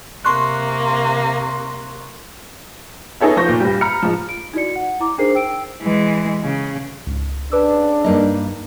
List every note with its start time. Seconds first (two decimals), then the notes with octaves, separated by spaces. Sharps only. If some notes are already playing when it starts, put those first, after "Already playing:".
0.25 C3 A#3 C6 C#6 F#6
3.21 B3 D#4 G#4 A4 C#5 E5
3.37 F3 C5 F5 C#6 G6 A#6
3.48 A#2
3.60 G2 G3
3.81 A#5 B5 F6 C#7
4.03 G#2 F3
4.29 D7
4.54 D#4 E4 F#4 D5 C#7
4.76 F#5
5.00 E4 A#5 D6
5.18 D4 D#4 G#4 A#4 C5 C7
5.35 G5 E6 D7
5.82 E3 G#3
6.43 C#3
7.07 C#2 G#2
7.52 C#3 D4 B4 D6 E6
8.04 G2 A#3 D#4